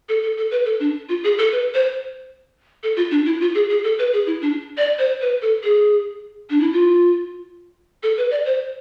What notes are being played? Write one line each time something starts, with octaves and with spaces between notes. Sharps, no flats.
A4
A4
A4
B4
A4
D4
F4
G#4
A4
B4
C5
A4
F4
D4
E4
F4
G#4
G#4
A4
B4
G#4
E4
D4
D5
C5
B4
A4
G#4
D4
E4
F4
A4
B4
D5
C5